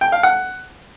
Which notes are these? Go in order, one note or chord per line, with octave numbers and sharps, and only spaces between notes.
G5
F5
F#5